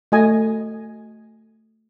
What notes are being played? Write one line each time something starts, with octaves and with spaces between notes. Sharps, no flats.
A3 F#4 D#5 G#5